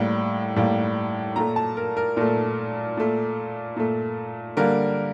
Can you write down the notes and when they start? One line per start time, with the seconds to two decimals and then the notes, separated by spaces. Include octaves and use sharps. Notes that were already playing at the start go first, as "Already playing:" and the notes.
Already playing: A2 G3 A#3
0.56 A2 G3 A#3
1.36 A#2 A3 A#5
1.56 A5
1.77 A#4
1.97 A#4
2.16 A#2 A3 A#4
2.97 A#2 A3
3.77 A#2 A3
4.57 D3 G3 A#3 A#4